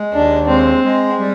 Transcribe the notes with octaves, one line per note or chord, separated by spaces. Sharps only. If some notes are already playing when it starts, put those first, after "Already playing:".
Already playing: G#3
D#2 D4
G#3 C4
G#3
G3